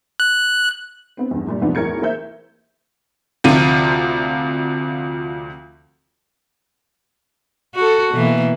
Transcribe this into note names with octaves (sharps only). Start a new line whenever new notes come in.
F#6
B3 C4
E2 G2
F#2 A#2 G3
E2 G#2 C3 F3 B3 D4
B1 E2 A2 A#4 G#6 C#7
A#3 A#4 C5 E5 G6
D2 C3 F3 F4 D#7
F#4 A4
B2 E3 A#3